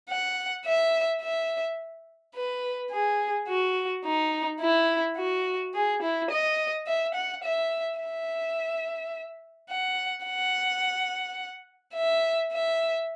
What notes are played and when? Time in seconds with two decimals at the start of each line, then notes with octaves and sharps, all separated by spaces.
0.09 F#5
0.65 E5
1.21 E5
2.34 B4
2.91 G#4
3.48 F#4
4.04 D#4
4.60 E4
5.17 F#4
5.74 G#4
6.02 E4
6.30 D#5
6.86 E5
7.14 F#5
7.44 E5
8.00 E5
9.69 F#5
10.25 F#5
11.95 E5
12.52 E5